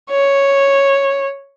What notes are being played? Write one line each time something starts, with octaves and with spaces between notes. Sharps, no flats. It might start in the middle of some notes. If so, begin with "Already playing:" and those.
C#5